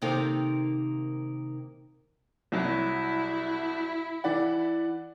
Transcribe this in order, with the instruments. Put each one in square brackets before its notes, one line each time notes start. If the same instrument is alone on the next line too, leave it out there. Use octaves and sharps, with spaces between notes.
[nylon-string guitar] C3 D#3 A#3 D#4 F4 A4
[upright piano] C2 F#3 [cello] E4
[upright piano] E3 D5 F#5